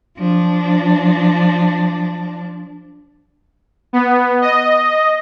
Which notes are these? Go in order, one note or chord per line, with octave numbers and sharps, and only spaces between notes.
F3 D4
B3
D#5